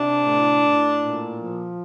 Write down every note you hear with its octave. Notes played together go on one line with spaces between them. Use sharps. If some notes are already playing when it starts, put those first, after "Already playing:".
Already playing: C3 D4
A2
A2
A#2
F3